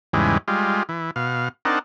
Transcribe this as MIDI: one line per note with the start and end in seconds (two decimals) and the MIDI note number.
0.13 0.38 40
0.13 0.38 44
0.13 0.38 49
0.13 0.38 52
0.13 0.38 55
0.13 0.38 56
0.48 0.83 55
0.48 0.83 56
0.48 0.83 65
0.89 1.11 52
1.16 1.49 47
1.16 1.49 77
1.65 1.79 60
1.65 1.79 62
1.65 1.79 63
1.65 1.79 70
1.65 1.79 78
1.65 1.79 81